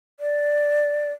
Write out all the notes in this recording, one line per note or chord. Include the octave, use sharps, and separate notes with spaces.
D5